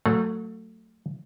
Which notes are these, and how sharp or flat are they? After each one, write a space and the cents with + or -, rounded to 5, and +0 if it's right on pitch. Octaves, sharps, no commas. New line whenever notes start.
F#3 -5 A3 +20 F#5 -35